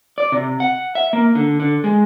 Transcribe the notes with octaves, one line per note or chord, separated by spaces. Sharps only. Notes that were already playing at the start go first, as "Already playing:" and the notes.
D5
C3
F#5
E5
A#3
D3
D3
G#3